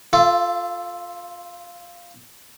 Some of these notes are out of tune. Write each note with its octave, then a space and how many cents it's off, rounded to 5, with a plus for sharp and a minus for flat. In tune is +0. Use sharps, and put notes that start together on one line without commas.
F4 +0 A4 +0 F5 -35